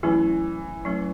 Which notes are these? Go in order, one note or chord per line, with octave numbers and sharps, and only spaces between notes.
E3 F#3 A3 C#4
F#3 A3 C#4